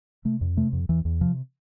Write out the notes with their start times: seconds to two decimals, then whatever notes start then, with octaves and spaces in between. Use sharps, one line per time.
0.25 C3 A3
0.41 F2
0.57 C3 A3
0.73 F2
0.89 E2 E3
1.05 E2
1.21 C3 F3